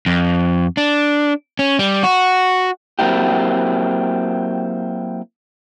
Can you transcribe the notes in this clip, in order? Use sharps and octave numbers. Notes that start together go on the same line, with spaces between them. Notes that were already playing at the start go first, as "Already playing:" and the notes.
F2
D4
C#4
G3
F#4
F#3 A#3 C4 E4 G4